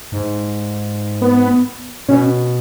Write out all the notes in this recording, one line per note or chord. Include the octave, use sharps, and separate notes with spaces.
G#2
B3
B2 C#4